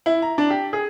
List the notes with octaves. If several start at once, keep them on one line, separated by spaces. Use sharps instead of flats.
E4
A#5
D4
G4
G#4